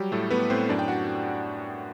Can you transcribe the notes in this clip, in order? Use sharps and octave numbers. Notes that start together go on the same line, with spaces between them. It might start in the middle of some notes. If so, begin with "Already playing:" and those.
Already playing: F#3 G3 G4
A2 A3 A4
A3 B3 B4
A2 C4 C5
F#2 D4 D5
G5
F#4 F#5